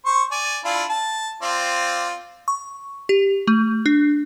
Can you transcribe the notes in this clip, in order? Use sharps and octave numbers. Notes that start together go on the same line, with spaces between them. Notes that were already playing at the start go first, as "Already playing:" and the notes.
C5 C#6
D5 G#5
D4 E4 F4
A5
C4 F4 D5
C#6
G4
A3
D4